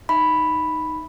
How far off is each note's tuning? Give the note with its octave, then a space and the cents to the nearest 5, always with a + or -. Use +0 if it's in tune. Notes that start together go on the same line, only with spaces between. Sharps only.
D#4 -5 E5 +0 B5 +0